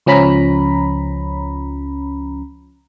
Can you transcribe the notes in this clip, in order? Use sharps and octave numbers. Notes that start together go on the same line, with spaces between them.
C#2 F3 C#4 A#5 B5